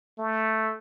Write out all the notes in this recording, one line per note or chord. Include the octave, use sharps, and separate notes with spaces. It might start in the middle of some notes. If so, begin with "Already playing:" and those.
A3